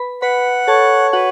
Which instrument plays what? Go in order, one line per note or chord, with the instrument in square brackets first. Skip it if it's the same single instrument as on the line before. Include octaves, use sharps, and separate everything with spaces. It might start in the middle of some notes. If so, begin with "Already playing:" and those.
Already playing: [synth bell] B4 B5
[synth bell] B4 B5 [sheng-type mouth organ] F#5
[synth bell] A4 A5 [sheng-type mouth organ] C#5
[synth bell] F#4 F#5 [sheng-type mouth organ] B4